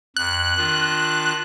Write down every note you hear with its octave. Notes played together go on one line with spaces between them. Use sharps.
F2 F#6
D#3 D4 F4